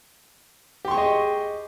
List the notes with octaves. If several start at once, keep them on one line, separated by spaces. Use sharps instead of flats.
G4 G#4 D#5 C6 C#6